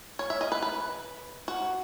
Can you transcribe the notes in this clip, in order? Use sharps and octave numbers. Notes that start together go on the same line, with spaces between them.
C#5
E5
D#5
B4
B4
F#4